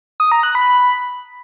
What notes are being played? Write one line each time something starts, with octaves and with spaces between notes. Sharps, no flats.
D#6
A#5
F#6
B5